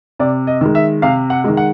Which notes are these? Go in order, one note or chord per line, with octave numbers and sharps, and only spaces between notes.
C3 D5
D#5
D#3 G#3
E5
C3 F5
F#5
D#3 G#3
F#5